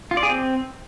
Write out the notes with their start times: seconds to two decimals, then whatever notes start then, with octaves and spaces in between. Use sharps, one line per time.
0.11 F4
0.17 D5
0.23 G#4
0.29 C4